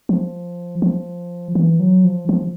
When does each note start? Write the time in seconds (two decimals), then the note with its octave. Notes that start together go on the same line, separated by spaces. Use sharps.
0.09 F3
0.82 F3
1.55 E3
1.80 F#3
2.04 F3
2.29 F3